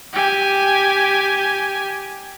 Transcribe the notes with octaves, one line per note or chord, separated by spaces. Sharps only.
G4 G#5